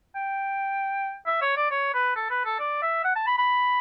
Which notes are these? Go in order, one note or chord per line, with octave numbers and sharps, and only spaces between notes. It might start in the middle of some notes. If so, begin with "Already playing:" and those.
G5
E5
C#5
D5
C#5
B4
A4
B4
A4
D5
E5
F#5
A5
B5
B5